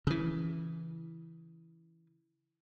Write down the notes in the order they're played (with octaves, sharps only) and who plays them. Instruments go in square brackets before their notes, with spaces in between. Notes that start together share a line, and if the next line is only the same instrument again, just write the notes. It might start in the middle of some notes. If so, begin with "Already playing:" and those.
[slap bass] C#3 E3